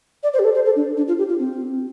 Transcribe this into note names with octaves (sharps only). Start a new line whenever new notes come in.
D5
C5
G4
A4
C5
A4
D4
D4
F4
G4
F4
C4